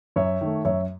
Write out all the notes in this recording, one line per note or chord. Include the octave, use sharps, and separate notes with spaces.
F#2 C#5 E5
D#3 A3
F#2 C#5 E5